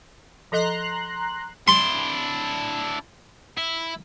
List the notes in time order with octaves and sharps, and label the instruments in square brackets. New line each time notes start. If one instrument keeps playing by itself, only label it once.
[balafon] F3 A4 D#5 [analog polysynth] A#5 C6 F#6
[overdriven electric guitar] D4 E4 [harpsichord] C6
[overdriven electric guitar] E4